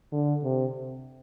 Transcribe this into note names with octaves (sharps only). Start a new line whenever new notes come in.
D3
C3